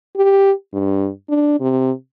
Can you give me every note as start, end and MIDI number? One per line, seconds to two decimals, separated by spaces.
0.16 0.52 67
0.73 1.08 43
1.29 1.58 62
1.60 1.91 48